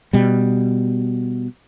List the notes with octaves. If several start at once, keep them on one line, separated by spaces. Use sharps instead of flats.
B2 G3